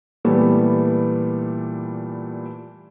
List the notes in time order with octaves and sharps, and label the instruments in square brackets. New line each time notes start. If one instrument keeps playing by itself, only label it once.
[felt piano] A#2 E3 G3 A3 B3